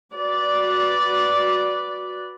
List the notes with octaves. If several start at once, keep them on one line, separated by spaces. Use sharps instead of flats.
F#4 B4 D5